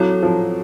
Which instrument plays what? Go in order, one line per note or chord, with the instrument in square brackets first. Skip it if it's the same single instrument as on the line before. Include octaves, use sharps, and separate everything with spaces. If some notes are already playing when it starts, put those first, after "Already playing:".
Already playing: [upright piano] F#3 [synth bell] C4 E4 A4 C#5
[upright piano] F3